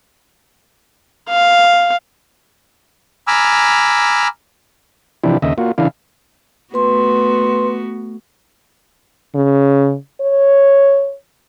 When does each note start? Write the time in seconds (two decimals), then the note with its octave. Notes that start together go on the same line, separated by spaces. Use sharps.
1.29 F5
3.27 G#5 A#5 B5 D6 E6 F6
5.24 C3 E3 F3 D4 E4 G4
5.42 D#2 C#3 D#5 E5
5.58 A#3 F4 F#4
5.78 C#3 E3 D4 E4 F5
6.74 A3 B3 F#4 B4 C6
9.35 C#3
10.21 C#5